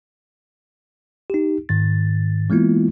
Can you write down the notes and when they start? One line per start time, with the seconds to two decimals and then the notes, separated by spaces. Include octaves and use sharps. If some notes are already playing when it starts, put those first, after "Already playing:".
1.30 D#4 G4
1.69 G#2 D#3 A6
2.50 E3 G#3 A#3 B3 E4 F4